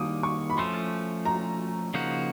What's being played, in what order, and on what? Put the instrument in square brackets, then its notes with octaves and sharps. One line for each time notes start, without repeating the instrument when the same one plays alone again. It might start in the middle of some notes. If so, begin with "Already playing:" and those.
Already playing: [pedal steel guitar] D#3 G3 A#3 [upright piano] D6 D#6
[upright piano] C#6
B5
[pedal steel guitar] F3 A3 C#4 [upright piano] C6
[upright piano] A#5
[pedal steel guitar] C#3 F3 A#3 D#4 F#4